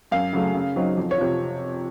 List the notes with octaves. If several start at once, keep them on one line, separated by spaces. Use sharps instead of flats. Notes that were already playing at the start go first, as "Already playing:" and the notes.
F#2 F5
C#3 F#3 A3
C#3
F#3 C4 D#4
F2
C#5
C3 F3